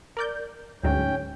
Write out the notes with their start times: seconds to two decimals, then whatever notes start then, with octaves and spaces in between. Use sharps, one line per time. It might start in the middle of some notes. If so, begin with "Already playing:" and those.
0.17 A#4 D5 G6
0.84 D2 G#2 F#3 C#4 G5